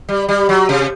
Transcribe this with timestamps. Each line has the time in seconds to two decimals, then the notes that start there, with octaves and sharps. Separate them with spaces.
0.09 G3
0.29 G3
0.49 F#3
0.69 C3